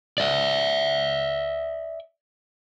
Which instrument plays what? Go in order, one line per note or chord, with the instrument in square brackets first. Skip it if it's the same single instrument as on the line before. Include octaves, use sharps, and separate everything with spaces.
[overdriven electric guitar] D5 E5